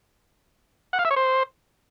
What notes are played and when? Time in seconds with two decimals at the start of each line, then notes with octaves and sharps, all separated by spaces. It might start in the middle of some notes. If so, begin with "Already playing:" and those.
0.93 F#5
0.99 F5
1.05 E5
1.11 C#5
1.16 C5